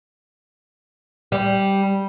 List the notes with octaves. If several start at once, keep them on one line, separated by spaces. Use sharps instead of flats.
G3